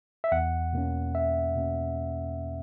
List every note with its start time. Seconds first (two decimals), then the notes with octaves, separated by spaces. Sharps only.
0.24 E5
0.32 E2 F#5
0.73 B2 A#3 C#4
1.14 E2 E5
1.56 B2 A#3 C#4